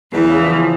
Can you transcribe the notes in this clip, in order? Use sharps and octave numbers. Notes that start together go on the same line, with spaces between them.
E2 E3
C#3
F3